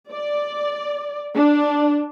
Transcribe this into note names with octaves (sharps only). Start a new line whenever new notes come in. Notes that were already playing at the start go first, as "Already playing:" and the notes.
D5
D4